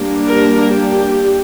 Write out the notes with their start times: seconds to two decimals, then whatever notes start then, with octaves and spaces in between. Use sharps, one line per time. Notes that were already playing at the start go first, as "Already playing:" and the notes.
Already playing: G3 A#3 D4
0.28 A#4
0.70 G4